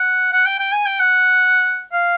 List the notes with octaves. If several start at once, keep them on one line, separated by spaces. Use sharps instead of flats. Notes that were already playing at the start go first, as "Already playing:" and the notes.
Already playing: F#5
F#5
G5
G5
G#5
G5
F#5
F5